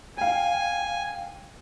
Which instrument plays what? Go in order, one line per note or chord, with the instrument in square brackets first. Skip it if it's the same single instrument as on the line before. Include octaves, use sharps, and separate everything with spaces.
[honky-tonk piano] F5 G5 [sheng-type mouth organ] G#5